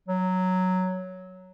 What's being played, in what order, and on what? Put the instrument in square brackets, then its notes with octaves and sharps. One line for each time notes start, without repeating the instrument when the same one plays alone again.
[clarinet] F#3